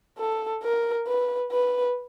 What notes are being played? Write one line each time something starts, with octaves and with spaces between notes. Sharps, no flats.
A4
A#4
B4
B4